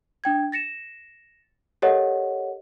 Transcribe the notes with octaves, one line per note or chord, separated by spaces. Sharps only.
D4 G5 G#6
A6 A#6 C#7 E7
G4 A4 A#4 C#5 D#5 F#5